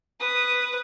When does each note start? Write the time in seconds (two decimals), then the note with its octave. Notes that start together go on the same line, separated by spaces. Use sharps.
0.20 B4 D#6